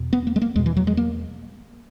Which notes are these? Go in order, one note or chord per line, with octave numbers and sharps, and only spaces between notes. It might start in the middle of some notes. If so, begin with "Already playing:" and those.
Already playing: E2 B2
B3
A#3
G#3
A#3
E2 B2 G#3
E3
F#3
G#3
A#3